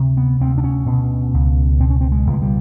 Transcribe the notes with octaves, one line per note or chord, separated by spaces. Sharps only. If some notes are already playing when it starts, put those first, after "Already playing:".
Already playing: D2 C3
B3
D2 C4
D4
C#4
B2
C#2
B2 C4
C#4
C4
G#3
C#2
G#3
G3